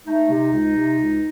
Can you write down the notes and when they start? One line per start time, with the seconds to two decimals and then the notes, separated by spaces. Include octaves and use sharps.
0.06 A3 D#4
0.29 C3
0.52 C#2
0.75 C3
0.98 C#2